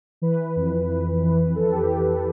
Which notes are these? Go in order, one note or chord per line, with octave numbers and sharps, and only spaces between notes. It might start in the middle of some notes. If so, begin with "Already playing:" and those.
E3 B4
F2
F2
E3
E3 A4
G4
F2 G4
A4